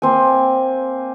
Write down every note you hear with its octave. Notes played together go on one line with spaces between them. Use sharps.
A#3 C4 G#5